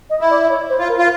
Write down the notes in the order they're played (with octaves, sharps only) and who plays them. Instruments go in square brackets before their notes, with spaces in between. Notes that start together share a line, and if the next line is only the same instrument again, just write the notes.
[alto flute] D#5
[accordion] E4
[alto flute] D5
C#5
C5
[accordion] F4
[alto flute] A#4
[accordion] F4